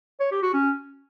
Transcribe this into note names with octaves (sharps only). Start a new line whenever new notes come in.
C#5
G4
F#4
C#4